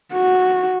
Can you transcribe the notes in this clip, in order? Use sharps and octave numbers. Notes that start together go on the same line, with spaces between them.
F#4